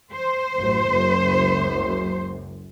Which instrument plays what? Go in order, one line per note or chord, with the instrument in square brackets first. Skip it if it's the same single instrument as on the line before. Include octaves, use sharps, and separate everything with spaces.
[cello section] C5
[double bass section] A1 F#2
F#1 C#2 F#2